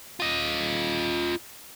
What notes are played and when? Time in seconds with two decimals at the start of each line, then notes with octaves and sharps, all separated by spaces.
0.20 F4 D#5